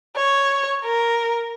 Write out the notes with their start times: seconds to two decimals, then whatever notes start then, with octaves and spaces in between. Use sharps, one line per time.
0.16 C#5
0.84 A#4